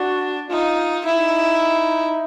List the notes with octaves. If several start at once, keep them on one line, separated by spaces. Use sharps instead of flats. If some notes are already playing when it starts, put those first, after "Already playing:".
Already playing: D4 F#4
D#4 F4
D#4 E4